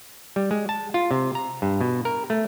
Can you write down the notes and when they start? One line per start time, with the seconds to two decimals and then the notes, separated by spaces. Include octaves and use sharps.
0.36 G3
0.51 G#3
0.69 A5
0.94 F4
1.11 C3
1.35 A#5
1.62 G2
1.81 B2
2.05 A#4
2.30 A3